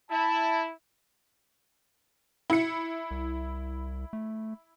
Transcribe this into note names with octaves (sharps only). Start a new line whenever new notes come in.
E4 A5
E4 C#7
C2
A3